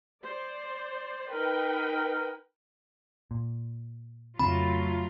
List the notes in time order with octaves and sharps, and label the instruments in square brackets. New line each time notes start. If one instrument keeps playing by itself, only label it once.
[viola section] C5 D5
[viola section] D#4 B4 G5 [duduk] A#4
[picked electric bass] A#2
[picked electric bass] F2 C#3 C4 [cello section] F#3 A3 F4 [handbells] B5